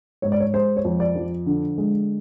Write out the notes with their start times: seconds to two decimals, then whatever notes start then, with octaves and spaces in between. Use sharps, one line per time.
0.22 G#2 C#5
0.32 D5
0.40 C#5
0.54 G#3 C5
0.76 C#5
0.84 F2
1.00 D5
1.15 F3
1.46 D3
1.78 G#3